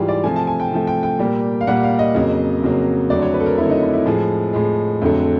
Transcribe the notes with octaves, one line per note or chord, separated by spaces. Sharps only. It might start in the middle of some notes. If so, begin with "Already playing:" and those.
Already playing: G#2 E3 G3 F4 G4 G#4
D5
C3 F3 A3 G#5
A5
G#5
G5
C3 F3 A3
G5
G5
A#2 G3 A#3
F5
A#2 G3 A#3 F#5
F5
D#5
F2 C#3 F#3 A#3
F2 C#3 F#3 A#3
F2 D3 F#3 A3 D5
C#5
B4
A4
A#4
F2 D3 F#3 A3 E4
D#4
E4
E4
A2 F3 G#3 G#4
A2 F3 G#3
F2 D3 F#3 A3